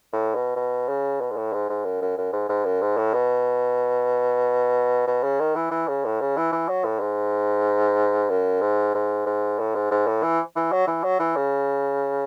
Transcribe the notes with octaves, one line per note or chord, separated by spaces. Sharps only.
A2
B2
B2
C#3
B2
G#2
A2
G#2
G#2
F#2
F#2
F#2
G#2
G#2
F#2
G#2
A2
B2
B2
C#3
D#3
E3
E3
C#3
A2
C#3
E3
E3
F#3
A2
G#2
F#2
G#2
G#2
G#2
A2
G#2
G#2
A2
E3
E3
F#3
E3
F#3
E3
C#3